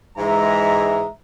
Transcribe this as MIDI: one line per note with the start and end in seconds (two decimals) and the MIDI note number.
0.18 1.05 44
0.18 1.05 52
0.18 1.05 56
0.18 1.09 76
0.18 1.09 82